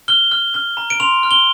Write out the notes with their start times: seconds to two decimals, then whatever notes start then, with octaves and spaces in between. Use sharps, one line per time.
0.08 F6 G7
0.31 F6
0.54 F6
0.77 A#5
0.90 D7
1.00 C6 F7
1.23 F6
1.31 G7